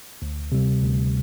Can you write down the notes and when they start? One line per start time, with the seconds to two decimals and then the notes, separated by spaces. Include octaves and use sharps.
0.22 D2
0.52 C3 G3
0.83 D2